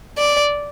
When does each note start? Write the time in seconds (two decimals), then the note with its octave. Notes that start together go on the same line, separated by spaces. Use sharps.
0.18 D5